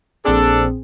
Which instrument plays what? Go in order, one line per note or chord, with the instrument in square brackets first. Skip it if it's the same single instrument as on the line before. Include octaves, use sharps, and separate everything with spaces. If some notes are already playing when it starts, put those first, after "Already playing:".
[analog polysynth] A#1 C4 G#4 [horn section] D4 A4